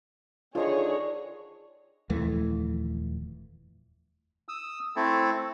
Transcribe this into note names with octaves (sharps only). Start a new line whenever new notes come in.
D3 D#3 F4 G#4 C5 C#5 D#5 C#6
D#1 F2 E3 A3
D#6 E6
A3 C4 E4 A4